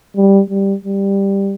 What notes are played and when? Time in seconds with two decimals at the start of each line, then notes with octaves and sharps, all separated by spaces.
0.17 G3
0.50 G3
0.85 G3